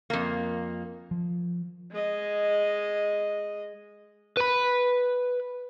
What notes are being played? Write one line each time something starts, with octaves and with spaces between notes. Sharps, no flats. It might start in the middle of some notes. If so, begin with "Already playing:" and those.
F2 A#3
F3
G#3 D#5
B4 B5